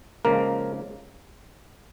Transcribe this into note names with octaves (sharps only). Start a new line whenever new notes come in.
C#3 F3 G#3 A#3 A#4